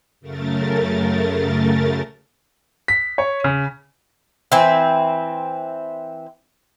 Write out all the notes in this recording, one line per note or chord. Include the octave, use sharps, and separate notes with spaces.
F#2 C#3 A3 A#4 A6
B6
C#5
C#3
E3 C4